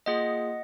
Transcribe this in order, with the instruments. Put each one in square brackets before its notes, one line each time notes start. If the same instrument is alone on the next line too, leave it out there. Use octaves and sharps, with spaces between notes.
[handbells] A#3 F4 G#4 D#5 F#5